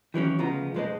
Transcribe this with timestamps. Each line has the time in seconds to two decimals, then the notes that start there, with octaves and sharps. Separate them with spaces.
0.14 D#3 E3 F#3 C#4
0.38 D2 C#3 F3 G#3 B3 A#5
0.74 B1 F2 G#3 B4 C5 D#5